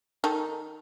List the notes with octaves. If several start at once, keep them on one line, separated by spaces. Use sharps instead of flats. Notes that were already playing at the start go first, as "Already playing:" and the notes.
D#3 D#4 A4